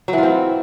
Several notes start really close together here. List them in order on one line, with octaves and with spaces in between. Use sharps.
F#3 E3 F4 C4